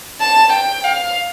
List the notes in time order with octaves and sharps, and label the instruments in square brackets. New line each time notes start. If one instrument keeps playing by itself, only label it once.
[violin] A5
G5
F5